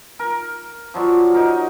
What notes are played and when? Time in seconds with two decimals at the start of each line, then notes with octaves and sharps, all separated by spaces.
0.19 A#4
0.94 F3 F#3 D5 C#6
1.34 D#4 A#4